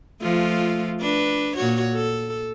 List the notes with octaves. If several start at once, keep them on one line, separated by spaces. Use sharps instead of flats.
F3 A3 F4
D4 B4
A#2 F#4 C#5
A4